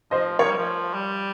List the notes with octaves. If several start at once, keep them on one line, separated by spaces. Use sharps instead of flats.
F3 C5 D#5
F3 A#4 C#5
G3
F3
G3